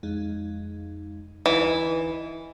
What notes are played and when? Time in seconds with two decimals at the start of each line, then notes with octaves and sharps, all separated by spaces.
0.03 F2 G#3 D#4
1.46 D2 E3 D#4 D#5